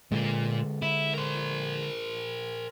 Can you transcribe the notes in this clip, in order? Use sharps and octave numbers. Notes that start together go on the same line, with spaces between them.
A#2 D3 G#3 A#3
E4
A#4 C5